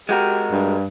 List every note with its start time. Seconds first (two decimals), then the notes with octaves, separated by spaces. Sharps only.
0.09 G#3 F#4 G4 A#4
0.51 G2